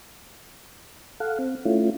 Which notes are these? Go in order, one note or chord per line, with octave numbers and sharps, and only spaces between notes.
A4 F5 F#5
C4
A3 C#4 E4 F4